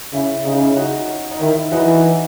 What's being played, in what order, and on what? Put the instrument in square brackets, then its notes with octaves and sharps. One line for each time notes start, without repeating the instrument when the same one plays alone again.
[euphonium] C#3 [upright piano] E4
[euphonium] C#3 [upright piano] D#4
[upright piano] E4
D#4 F#4
D#4
[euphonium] D#3 [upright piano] E4
[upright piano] E4
[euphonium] E3 [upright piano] D#4 F#4